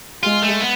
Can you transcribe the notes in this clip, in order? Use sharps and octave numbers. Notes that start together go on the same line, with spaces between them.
G#3 F4
A3
B3